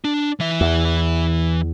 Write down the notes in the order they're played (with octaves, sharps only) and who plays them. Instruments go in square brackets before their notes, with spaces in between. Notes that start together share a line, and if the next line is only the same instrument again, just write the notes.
[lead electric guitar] D4
E3 E5
[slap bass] E2